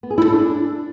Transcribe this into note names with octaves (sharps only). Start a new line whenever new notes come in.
B3
G#4
E4
A4
D4